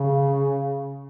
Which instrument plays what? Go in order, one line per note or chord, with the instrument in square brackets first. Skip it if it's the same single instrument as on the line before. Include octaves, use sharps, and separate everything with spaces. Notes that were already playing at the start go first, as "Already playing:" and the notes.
Already playing: [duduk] C#3